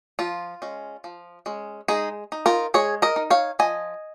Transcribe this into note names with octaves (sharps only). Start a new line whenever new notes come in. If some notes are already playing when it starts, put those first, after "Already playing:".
F3 F4
G#3 C#4
F3
G#3 C#4
G#3 D#4 G#4
D#4
F4 A#4
G#3 G#4 C#5
A#4 D#5
D#4
C#5 F5
F3 D#5 G#5